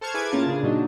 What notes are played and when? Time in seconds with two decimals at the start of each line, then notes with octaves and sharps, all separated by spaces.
0.01 A4 C5 A5 C#6 F6 G#6
0.14 E4 G#4 B4 D6 G#6
0.30 A2 A#3 C#4 F4 A5 A6
0.46 C#3 D4 G#4
0.63 A#2 F#3 D4 D#4